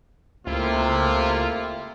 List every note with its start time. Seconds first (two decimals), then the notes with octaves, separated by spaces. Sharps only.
0.47 C#2 C3 A3 A#3 E4 F4